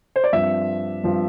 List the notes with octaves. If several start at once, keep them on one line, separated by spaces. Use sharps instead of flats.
C5
D5
G2 F3 C4 E5
G2 F3 C4